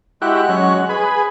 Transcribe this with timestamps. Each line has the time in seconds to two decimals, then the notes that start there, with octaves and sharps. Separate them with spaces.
0.22 G#3 E4 F#4 G4 F#6
0.49 F#3 C#4
0.89 G#4 B4 B5